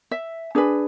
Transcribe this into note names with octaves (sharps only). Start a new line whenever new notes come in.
E5
D4 G#4 B4